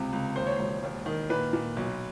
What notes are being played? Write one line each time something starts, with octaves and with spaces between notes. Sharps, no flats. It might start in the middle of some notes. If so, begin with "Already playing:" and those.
Already playing: C#2 C3
C#2
D#2 C5
C#5
E1 C5
D#2
D#3
A#2 B4
A#2
B1